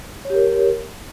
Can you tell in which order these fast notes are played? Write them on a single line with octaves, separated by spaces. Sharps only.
C#5 G4 A#4